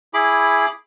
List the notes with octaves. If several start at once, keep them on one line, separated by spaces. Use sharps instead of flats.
E4 G#4 B5 D6